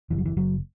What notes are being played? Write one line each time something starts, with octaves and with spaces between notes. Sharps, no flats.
F#1 E3
F#3
E3
F#1 F#3